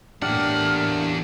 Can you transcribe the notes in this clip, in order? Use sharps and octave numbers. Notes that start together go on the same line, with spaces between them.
E2 A2 A#3 D4 G4 F#5 F6